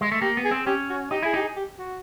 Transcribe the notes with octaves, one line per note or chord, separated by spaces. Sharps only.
G#3
A3
A#3 G4
B3
G#4
C4
C#4 G4
F#4
D#4 G4
E4 G#4
D#4 G4
G#4
G4
F#4